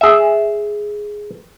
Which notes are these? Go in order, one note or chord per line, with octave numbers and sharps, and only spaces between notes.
G#4 E5